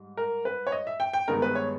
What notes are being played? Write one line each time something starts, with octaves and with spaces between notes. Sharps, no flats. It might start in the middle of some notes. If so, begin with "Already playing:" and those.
Already playing: G#2 G3
A#4
B4
C#5
D#5
E5
G5
G5
G2 D#3 G#3 B3 D#4 A#4
B4
C#5